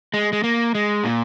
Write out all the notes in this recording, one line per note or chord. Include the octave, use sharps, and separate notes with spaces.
G#3
G#3
A#3
G#3
A#2